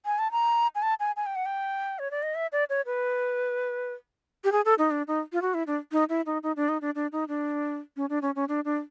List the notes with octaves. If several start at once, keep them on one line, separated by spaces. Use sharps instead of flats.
G#5
A5
A#5
G#5
A5
G#5
G#5
G5
F#5
G5
C#5
D5
D#5
E5
D5
C#5
B4
G4
G#4
A4
D#4
D4
D#4
F4
F#4
E4
D4
D#4
E4
D#4
D#4
D4
D#4
D4
D4
D#4
D4
C#4
D4
C#4
C#4
D4
D4